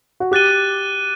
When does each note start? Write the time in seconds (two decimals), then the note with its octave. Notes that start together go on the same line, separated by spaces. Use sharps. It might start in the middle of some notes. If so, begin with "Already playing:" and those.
0.20 F#4
0.31 G4 D6 F#6 A6 D#7 G7